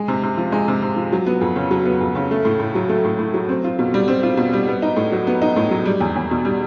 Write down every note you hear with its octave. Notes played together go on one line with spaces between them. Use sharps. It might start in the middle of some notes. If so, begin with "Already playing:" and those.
Already playing: G#3
C3
C3
F3
G#3
C3
C3
F3
F#3
B3
F2
C#3
F#3
B3
F2
C#3
A3
A2
A2
F#3
A3
A2
A2
F#3
C4
F4
B2
G3
C4
F4
B2
G3
B3
D#4
A2
F#3
B3
D#4
A2
F#3
G3
E2
E2
B2
G3